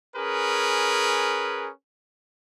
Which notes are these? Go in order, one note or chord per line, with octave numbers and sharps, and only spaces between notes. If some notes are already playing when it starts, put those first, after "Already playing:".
C#4 G#4 A#4 B4